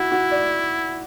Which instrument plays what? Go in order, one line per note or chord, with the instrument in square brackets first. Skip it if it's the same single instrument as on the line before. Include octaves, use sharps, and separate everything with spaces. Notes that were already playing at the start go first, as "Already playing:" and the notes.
Already playing: [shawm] E4 [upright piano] F#4
[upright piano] F#4
D5